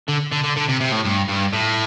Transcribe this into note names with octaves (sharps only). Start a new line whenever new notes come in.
D3
D3
D3
D3
C3
C3
A2
G2
G2
A2